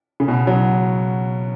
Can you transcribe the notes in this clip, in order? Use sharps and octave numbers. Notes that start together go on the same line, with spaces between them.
C#3
B2
F#3